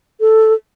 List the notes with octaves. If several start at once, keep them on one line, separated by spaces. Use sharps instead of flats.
A4